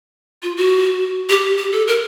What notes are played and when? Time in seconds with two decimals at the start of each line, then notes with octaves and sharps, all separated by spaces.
0.43 F4
0.57 F#4
1.29 G4
1.57 G4
1.72 A4
1.88 A#4